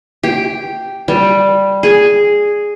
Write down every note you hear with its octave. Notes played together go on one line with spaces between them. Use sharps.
G4
G3
G#4